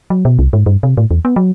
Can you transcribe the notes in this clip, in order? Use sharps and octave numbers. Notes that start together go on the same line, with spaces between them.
F#3
B2
C2
G#2
G2
C3
A2
E2
B3
F#3